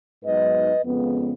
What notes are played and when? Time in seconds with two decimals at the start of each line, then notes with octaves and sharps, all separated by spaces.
0.23 G#2 F#3 B3 D#4 B4 D#5
0.84 F2 C#3 G#3 B3